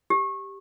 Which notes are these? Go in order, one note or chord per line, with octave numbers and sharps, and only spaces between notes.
G4